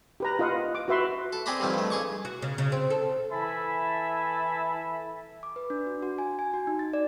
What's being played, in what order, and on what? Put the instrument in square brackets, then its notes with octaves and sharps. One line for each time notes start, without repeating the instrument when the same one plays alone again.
[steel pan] G4 B4 A#5
F4 B4 D#5 F5 F#5
D6
F#4 B4 E5 C6
[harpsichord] A4
C4 G#4 C5 D5 A#5 B5
G2 D3 D#3 F3 C4
G2 A3
C#2 G#4 C#6 D6
[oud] F#4
C#3
C#3
C4
A4
[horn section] E3 A4 E5 G#5 B5
[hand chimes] D6
B4
D4
F#4
F#4
G#5
G#5
F#4
D#4
A6
D5